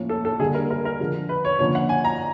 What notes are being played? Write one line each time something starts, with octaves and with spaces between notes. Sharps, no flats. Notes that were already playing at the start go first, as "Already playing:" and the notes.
Already playing: A2 F3 A#3 C#4
A4
A4
D3 G3 A#3 G#4
A#4
A#4
A#4
D3 F3 G#3
B4
C#5
D3 F3 A#3 C#4 C#5
F#5
G#5
A#5